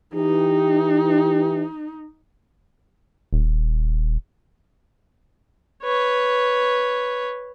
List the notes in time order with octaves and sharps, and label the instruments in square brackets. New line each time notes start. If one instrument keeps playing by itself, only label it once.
[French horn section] E3 G4 [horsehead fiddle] D#4
[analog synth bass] D#1
[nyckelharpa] B4 C#5